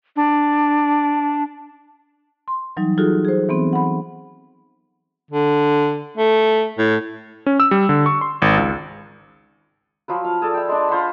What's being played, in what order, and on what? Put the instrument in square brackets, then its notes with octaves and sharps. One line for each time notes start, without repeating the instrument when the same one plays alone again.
[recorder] D4
[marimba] C6
E3 F#3 G3 D#4
D#4 F4 F#4 G#4 A4
G#4 C5
E3 B3 C4
F#5 B5
[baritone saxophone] D3
A3
A2
[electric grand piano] C#4
E6
G3
D3
C#6
C6
G#1
C#2
[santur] F3 F#3 B4
F5
G#4 A4 D5
E5 G5
G#3 D4
F4 C5 F#5 B5